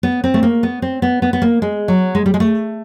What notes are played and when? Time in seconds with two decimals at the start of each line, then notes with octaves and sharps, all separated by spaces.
0.03 B3
0.24 C4
0.34 A3
0.43 A#3
0.63 B3
0.82 C4
1.02 B3
1.22 B3
1.33 B3
1.42 A#3
1.62 G#3
1.88 F#3
2.15 G#3
2.26 G3
2.34 G#3
2.40 A3